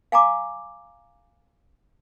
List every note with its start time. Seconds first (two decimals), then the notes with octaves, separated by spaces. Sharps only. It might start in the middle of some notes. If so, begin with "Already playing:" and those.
0.12 F5 G#5 A#5 D6